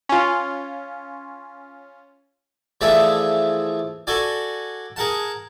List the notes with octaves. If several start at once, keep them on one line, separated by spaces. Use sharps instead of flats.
C#4 F4
E3 F3 A3 G#4 D5 E5
F#4 A4 D5 G#5
G#4 A#4 F#5 A5